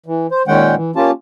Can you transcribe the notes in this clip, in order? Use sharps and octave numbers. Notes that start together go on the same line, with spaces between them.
E3
C5
A#2 D#3 G#3 C#4 F#5 G5
E3
A#3 C#4 F4 G4 A5